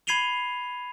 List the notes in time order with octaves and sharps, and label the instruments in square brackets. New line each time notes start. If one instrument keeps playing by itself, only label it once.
[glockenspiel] B5 G#6 C7 D#7 F7 G7